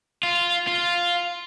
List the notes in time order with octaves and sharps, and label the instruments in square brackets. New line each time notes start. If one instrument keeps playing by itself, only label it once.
[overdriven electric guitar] F4
F4